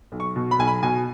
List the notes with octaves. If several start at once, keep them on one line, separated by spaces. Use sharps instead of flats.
B1
C#6
B2
B5
B1 G#5
B5
B2 G#5